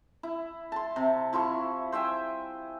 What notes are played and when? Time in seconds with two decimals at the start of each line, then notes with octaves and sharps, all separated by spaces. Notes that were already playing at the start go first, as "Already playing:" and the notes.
0.23 E4
0.72 A5 C6
0.96 C3
1.33 F3 E4 C6 C#6
1.92 C5 E5 G5 G#5